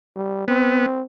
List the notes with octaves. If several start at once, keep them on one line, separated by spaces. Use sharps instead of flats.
G3
B3 C4